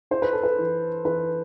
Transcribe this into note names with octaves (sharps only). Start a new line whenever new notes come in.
E4 C5
B4
A4
B4
E3
E3 B4